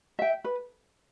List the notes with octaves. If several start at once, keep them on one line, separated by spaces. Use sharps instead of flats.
E5 G5
B4